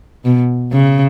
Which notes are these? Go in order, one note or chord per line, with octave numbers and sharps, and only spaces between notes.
B2
C#3